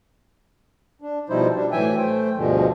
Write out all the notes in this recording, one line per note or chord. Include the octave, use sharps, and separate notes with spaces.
D4
B2 F3 G3 D#4 E4 C5
G3 D4
A2 E3 F#3 E5 G5 G#5
A3 C5 G5
D2 G2 B2 D3 F3 G#3